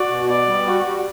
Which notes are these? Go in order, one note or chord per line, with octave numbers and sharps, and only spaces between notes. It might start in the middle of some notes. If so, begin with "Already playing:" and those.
Already playing: F#4 D5
B2
B3 D5
G3
F#4
G3